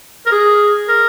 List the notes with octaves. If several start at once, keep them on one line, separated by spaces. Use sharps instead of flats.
A#4
G#4
A#4